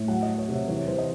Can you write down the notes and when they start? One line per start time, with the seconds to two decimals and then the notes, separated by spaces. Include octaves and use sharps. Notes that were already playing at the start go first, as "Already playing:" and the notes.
Already playing: A2
0.08 F#3 F#5
0.23 D#5
0.28 F#3
0.38 C#5
0.48 C3 E5
0.68 E3 C#5
0.88 E3 C5
0.98 D#5